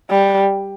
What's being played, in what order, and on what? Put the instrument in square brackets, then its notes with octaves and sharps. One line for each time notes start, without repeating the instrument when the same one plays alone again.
[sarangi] G3